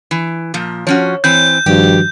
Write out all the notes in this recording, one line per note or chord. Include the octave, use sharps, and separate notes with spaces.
E3
A#2 F3
F3 C#4 F#4 C#5
E3 C4 G6
G2 D#3 F3 F#4 G4